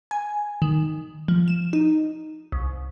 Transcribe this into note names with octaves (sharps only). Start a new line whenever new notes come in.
G#5
D#3
F3
E7
D#4
C2